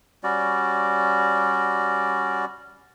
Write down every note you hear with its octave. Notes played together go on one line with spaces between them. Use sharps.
G3 C#4 F#4 D5